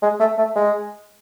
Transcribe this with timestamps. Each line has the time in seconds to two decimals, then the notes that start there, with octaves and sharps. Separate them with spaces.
0.03 G#3
0.20 A3
0.38 A3
0.56 G#3